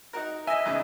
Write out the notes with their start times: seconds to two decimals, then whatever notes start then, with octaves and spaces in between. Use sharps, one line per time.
0.13 D#4 F#4 A#4
0.47 D#5 E5 G#5
0.66 E2 G#2 C#3